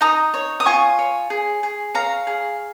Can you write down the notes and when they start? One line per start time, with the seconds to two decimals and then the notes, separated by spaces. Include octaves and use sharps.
0.01 D#4 A#5 D#6
0.34 C#5
0.60 D#6
0.66 F4 G#5 C#6
0.99 C#5
1.30 G#4
1.63 G#4
1.94 C#5 F5 A#5
2.27 G#4